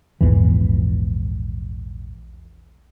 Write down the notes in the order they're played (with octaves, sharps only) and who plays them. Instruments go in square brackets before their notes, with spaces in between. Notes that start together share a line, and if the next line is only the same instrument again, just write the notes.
[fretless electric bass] A#1 E2 G#2 E3